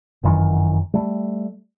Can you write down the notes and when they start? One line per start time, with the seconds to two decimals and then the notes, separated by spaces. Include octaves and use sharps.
0.23 G1 F#2 D#3 E3
0.94 G3 A3